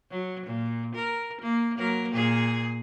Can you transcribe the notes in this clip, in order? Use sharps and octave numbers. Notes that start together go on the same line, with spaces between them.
F#3
A#2
A#4
A#3
F#3 A#3 A#4
A#2 G#4